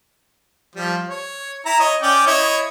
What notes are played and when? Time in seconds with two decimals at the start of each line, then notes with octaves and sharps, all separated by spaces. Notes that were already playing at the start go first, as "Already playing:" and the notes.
0.76 F3 G3
1.09 C#5
1.66 E4 A#5
1.80 C#5 D#5
2.02 C#4 D5 G5
2.27 E4 C#5 D#5